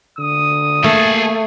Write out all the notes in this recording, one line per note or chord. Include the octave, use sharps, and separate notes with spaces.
D3 D#6
A3 A#3 G#4 A5